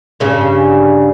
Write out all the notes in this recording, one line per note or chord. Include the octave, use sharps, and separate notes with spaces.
G2 C#3